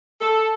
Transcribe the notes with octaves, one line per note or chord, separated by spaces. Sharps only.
A4